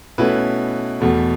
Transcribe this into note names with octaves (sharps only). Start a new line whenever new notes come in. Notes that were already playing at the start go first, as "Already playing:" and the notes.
B2 A3 C#4 E4 B4
E2 B2 A3